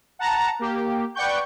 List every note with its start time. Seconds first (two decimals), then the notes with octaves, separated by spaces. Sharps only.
0.19 F#5 A5 A#5
0.59 A#3 G4
1.15 B4 D5 F#5 G5 C#6 G6